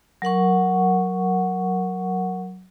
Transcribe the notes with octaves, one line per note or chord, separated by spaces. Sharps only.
F#3 A#4 F#5 C#6